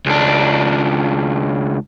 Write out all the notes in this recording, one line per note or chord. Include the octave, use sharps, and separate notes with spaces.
C#2 D4